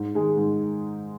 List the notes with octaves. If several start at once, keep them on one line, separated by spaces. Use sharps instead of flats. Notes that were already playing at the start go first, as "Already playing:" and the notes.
Already playing: G#2
D#3 G#3 D#4 G#4
G#2